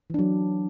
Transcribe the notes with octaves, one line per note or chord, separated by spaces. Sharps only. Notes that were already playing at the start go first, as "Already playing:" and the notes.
E3 F#3 D4